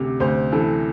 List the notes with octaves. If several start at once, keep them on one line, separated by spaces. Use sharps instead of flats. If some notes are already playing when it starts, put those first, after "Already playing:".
Already playing: D2 C3
D2 C5
E3 A4